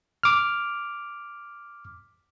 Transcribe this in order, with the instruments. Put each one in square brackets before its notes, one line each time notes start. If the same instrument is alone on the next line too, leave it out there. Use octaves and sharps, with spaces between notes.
[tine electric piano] D6 F6